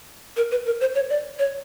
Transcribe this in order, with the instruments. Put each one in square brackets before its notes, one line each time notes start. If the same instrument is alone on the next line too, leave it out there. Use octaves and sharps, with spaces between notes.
[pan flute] A#4
B4
A#4
C5
C#5
D5
C#5